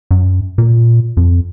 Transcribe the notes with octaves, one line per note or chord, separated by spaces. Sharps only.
F#2
A#2
F2